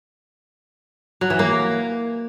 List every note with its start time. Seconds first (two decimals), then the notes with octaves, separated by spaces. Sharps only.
1.21 F#3
1.30 E3
1.39 A#3